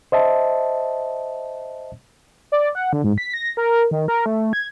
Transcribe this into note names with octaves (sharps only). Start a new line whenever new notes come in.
C5 D#5 E5 A5
D5
F#5
D3
G#2
B6
A#6
A#4
D#3
A#4
A3
G#6